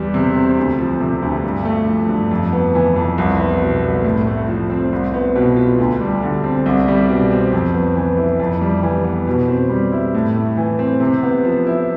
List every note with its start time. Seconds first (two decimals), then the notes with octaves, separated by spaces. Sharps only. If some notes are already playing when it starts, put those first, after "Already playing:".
Already playing: E2 G3
0.14 C3
0.35 C4
0.57 D2
0.79 F3
1.00 C3
1.22 D2
1.43 G2
1.65 A3
1.88 F3
2.09 G2
2.31 F2
2.52 B3
2.75 E3
2.96 F2
3.18 C2
3.40 B3
3.61 B2
3.84 C2
4.04 A2
4.27 A3
4.48 F3
4.70 C4
4.92 C2
5.14 B3
5.35 B2
5.56 F4
5.78 D2
6.00 G3
6.22 D3
6.44 C4
6.66 C2
6.88 G3
7.09 B2
7.31 C4
7.52 F2
7.74 B3
7.96 E3
8.17 E4
8.40 F2
8.61 G3
8.83 E3
9.04 B3
9.27 B2
9.48 C4
9.70 G3
9.92 E4
10.14 A2
10.36 A3
10.57 E3
10.79 C4
11.00 C3
11.23 B3
11.45 F3
11.67 E4